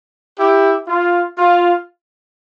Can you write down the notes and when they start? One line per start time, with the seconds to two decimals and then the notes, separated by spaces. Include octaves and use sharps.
0.40 E4 G4
0.88 F4
1.38 F4